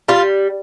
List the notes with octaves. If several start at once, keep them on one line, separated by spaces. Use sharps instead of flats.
G3 F4